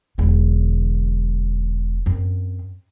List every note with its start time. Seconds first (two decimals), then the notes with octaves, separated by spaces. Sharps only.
0.18 E1 D3
2.06 F#2 C4